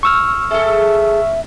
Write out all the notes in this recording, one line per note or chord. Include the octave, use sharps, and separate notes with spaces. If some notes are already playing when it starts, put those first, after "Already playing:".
C#6 E6 F6
G#4 A4 E5